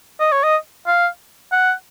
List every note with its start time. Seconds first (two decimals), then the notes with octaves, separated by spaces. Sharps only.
0.20 D#5
0.32 C#5
0.44 D#5
0.87 F5
1.52 F#5